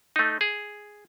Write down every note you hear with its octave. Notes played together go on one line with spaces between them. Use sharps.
A3 D#4
G#4